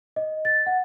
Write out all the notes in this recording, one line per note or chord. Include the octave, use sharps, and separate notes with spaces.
D#5
A6
F#5